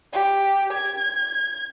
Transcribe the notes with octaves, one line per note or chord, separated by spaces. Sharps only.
G4
G#6